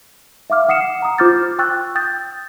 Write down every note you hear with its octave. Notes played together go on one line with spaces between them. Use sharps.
E5 F5 D6 F6
F#5 D#6 C7 C#7 E7
A#5 D#6
F4 C5 D6 F6 G6 A6
G5 C#6 E6 F#6 A6
G5 D#6 G6 A6